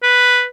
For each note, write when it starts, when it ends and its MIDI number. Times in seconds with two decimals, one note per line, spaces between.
0.03 0.44 71